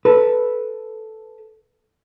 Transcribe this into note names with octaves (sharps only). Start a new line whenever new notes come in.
A4 B4